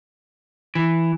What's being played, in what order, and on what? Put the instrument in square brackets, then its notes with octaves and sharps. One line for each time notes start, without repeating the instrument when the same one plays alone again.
[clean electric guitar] E3